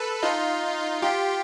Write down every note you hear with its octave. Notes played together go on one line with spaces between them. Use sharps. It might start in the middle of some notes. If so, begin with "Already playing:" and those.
Already playing: A4 B4
D#4 F4
F4 G4